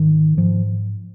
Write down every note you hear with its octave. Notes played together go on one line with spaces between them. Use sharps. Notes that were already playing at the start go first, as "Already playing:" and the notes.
Already playing: G#2 D#3
G#2 F3